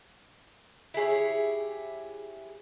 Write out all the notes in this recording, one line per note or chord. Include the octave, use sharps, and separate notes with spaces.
E4 G4 G#4 C#5